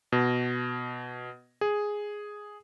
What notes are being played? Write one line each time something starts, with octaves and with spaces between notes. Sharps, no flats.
B2
G#4